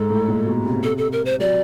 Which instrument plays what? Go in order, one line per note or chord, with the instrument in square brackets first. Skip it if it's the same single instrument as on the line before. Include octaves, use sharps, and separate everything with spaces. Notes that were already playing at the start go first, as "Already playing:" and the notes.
Already playing: [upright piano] G#2 [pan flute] A4
[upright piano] A2
A#2
B2
C3
[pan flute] A4
A4
A#4
C5
[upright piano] F#3 [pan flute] D5